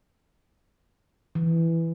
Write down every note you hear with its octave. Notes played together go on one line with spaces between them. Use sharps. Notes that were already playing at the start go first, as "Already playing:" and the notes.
E3